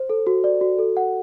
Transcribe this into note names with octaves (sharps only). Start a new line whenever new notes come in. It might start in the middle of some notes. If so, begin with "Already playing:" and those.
Already playing: C5
A4
F#4
D5
F#4
A4
F#5